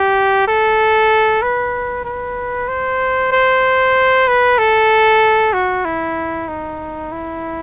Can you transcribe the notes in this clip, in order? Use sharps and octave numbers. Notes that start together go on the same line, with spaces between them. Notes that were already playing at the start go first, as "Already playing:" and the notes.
Already playing: G4
A4
B4
B4
C5
C5
B4
A4
F#4
E4
D#4
E4